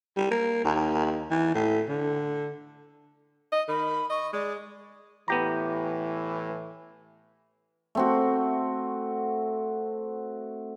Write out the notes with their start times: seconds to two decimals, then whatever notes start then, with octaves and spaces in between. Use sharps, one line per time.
0.16 G3
0.31 A#3
0.64 D#2
1.31 E3
1.54 A2
1.88 D3
3.52 D#5
3.68 D#3 B5
4.10 D#5 C#6
4.33 G#3 D5
5.28 A2 E3 B3 G4 A#5
7.95 A3 C4 F#4